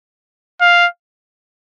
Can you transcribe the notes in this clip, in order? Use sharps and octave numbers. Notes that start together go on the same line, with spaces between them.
F5